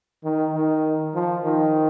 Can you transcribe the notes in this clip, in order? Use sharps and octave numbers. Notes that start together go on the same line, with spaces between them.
D#3
D#3
F3
D#3